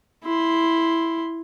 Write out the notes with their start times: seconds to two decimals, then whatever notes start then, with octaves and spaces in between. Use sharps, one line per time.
0.24 E4 C6